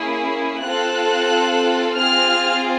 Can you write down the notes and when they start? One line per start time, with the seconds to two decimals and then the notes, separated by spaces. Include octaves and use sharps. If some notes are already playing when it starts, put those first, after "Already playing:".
Already playing: A#3 C#4 E4 G#4
0.63 C4 F4 A4 F#6
1.95 C4 F4 G#4 F6